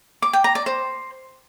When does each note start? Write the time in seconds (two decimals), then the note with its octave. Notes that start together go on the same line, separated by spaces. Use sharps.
0.22 D6
0.33 G5
0.44 A#5
0.55 D5
0.66 C5